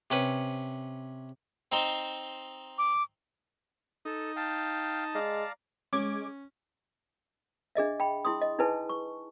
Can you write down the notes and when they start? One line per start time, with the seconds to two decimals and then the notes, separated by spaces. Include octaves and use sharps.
0.10 C3 C#4 B4
1.72 C4 D#4 C5
2.78 D6
4.05 D#4 A4
4.36 F5 G5 A5
5.15 G#3 D5 F5 A#5
5.93 G#3 C#4 D6 G#6
7.75 D4 G#4 D#5 E5
8.00 G5 B5
8.25 E4 G#4 C6 D#6
8.41 D#5
8.59 D#4 E4 G#4 B4 G#5 A5
8.89 C#6